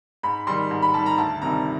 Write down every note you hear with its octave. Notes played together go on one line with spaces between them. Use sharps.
G#2 B5
D#3 G3 C6
G#2
B5
D#3 G3 A5
A#5
D2 A5
C3 D#3 G3 A#5